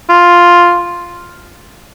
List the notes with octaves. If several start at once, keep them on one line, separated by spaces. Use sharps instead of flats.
F4